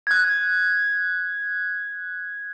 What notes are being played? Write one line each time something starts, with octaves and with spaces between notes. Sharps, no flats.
F#6 G#6